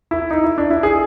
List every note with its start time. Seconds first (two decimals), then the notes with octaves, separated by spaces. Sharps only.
0.11 E4
0.31 D#4
0.44 E4
0.58 D4
0.70 E4
0.83 G#4